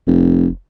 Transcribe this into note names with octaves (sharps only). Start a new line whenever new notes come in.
F1